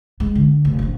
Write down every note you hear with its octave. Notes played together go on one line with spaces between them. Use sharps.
G#3
D3
F1
A#1 F3